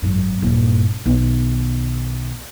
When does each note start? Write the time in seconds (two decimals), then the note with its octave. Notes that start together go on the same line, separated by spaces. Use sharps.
0.02 G#1 F#2
0.42 D#1 G2
1.06 B1 D#3